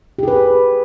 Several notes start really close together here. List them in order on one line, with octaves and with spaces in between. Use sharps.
G4 G#4 B4